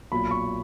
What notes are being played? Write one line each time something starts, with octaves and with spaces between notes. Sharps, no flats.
B1 A#2 B5
C#6